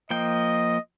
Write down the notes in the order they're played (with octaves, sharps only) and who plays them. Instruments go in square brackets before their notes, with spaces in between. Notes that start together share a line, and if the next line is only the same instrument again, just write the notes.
[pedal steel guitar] F3 A#3 G5 [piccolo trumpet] D#5